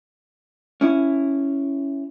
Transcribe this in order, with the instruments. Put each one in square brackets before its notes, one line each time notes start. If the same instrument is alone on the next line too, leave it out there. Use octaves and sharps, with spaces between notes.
[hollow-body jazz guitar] C#4 E4